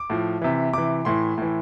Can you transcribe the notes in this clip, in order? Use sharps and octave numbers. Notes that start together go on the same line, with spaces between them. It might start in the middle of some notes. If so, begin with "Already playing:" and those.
Already playing: D6
A2 F3
C3 E3
C3 E3 D6
A2 E3 C6
A2 E3